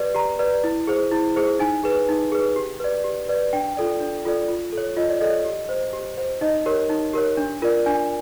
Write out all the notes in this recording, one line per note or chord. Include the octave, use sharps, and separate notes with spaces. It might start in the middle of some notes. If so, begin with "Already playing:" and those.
Already playing: G4 B4 D5
G4 A#5
B4 D5
E4
G#4 C5
E4
G#4 C5
D#4 G#5
G#4 B4
D#4
G#4 B4
G4
B4 D5
G4
B4 D5
D4 G5
F4 A4 D5
D4
F4 A4 D5
F4
A4
C#5
F4 D#5
D5
A4 C#5 D#5
G4
C5
G4
C5
D#4 D#5
G4 A#4 C#5
D#4
G4 A#4 C#5
D4
F4 A#4 D5
D4 G#5